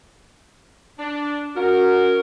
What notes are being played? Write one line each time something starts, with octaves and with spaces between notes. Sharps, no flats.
D4
C#4 F#4 A#4